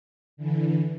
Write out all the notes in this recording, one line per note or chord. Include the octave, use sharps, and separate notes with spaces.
D3 E3